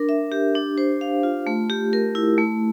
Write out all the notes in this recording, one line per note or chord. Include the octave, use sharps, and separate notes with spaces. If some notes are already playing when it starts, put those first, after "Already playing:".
Already playing: D4 A#4
E5
G4
D4
C5
F5
F4
A3
G4
A#4
E4
A3